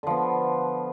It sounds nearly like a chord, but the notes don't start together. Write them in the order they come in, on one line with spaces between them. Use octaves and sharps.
D3 F3 B3